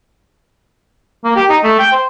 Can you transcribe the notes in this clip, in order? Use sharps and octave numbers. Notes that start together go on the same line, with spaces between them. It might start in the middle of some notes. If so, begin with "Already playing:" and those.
A#3
G4
D#4
A3
G5
C5